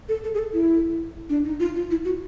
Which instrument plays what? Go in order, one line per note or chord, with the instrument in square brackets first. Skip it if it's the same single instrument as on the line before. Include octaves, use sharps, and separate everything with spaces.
[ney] A4
A4
G#4
A4
E4
D4
D#4
F4
F4
E4
F#4